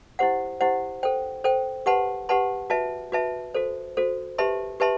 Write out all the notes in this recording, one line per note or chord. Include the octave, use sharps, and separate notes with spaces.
E4 G4 C5 F#5
E4 G4 C5 F#5
A4 C5 G5
A4 C5 G5
G4 B4 F#5 A5 C6
G4 B4 F#5 A5 C6
F#4 B4 E5 A5
F#4 B4 E5 A5
F#4 A4 C5
F#4 A4 C5
G4 B4 E5 A5 C6
G4 B4 E5 A5 C6